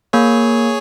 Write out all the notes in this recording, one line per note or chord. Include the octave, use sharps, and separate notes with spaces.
A#3 G#4 C#5